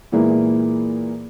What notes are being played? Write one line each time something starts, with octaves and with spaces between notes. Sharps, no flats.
A#2 E3 G#3 A#3 B3 E4